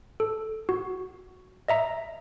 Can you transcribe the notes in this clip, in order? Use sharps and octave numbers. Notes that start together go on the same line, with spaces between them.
A4
F#4
D#5 E5 A#5